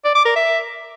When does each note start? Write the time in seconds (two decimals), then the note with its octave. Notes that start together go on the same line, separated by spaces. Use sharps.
0.04 D5
0.15 D6
0.25 A#4
0.35 E5